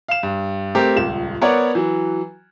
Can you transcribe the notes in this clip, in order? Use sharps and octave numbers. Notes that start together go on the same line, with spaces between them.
F5 E7
G2
A3 C4 G4 A#4
D#1 C#2 E7
B3 A#4 C#5 D5 F#5
E3 F#3